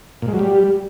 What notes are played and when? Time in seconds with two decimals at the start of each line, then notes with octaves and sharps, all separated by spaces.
0.22 A#2
0.28 G#3
0.34 F#3
0.39 G3